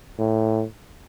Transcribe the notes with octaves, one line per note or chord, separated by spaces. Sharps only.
A2